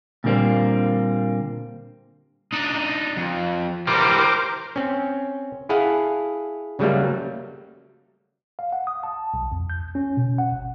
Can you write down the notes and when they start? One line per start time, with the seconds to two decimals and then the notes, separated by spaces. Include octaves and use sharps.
0.24 A#2 D3 G3 A#3 C4
2.53 D4 D#4
3.17 F2
3.87 E3 G3 A#4 C5 D6
4.76 C4 C#4
5.69 E4 G#4 A4 F5 F#5
6.79 C#3 F#3 G3 A3 A#3
8.59 F5
8.73 F#5
8.87 D#6
9.03 A5
9.34 B1
9.52 F2
9.70 G6
9.95 C#4
10.17 B2
10.38 F#5
10.52 G#1